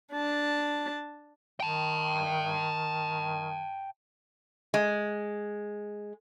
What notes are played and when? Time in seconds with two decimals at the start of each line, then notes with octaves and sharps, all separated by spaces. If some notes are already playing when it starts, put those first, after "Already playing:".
0.13 D4 A5
1.60 D#3 G5 A5
4.74 G#3